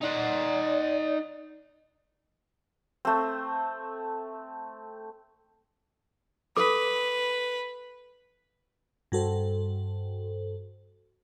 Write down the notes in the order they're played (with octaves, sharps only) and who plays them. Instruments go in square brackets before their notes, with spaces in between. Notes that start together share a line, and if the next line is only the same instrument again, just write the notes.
[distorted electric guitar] D#4 F#5 [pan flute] D5
[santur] A3 C4
[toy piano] A4 D6 [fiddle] B4
[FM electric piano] G2 F#4 A4 C5